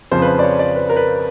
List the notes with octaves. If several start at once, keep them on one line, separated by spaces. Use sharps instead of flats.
F2 C#3 F3 C5
B4
C5
D5
C#5
D5
B4
A#4
B4